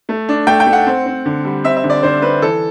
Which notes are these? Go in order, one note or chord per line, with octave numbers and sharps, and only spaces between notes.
A3
D4
A3 G5
G5
A3
F#5
C4
C4
D3
G3
C4 E5
E5
D3
D5
D3 C5
C4 B4
E3 A4